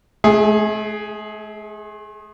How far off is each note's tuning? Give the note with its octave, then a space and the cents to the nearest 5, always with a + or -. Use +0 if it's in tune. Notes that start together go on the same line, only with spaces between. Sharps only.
A3 -45 G#4 +0